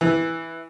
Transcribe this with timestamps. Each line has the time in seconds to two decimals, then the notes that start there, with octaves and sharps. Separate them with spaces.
0.01 E3